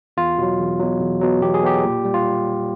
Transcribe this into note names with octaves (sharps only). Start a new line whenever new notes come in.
E2 F4
B2 F#3
E2
B2 F#3
E2
B2 F#3
E2 G4
G#4
B2 F#3 G4
A#2
G3
F4